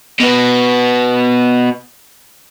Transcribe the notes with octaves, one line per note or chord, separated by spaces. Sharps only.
B2 B3